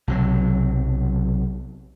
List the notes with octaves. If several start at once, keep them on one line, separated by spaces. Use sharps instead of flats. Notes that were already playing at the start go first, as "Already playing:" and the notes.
B1 C3 F#3